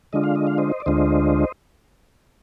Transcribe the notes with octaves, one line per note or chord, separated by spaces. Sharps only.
D3 G#3 D4 F4 D#5
F5
D#5
F5
C5 D#5
D5
D2 D3 G#3 D4 F4 C5 D#5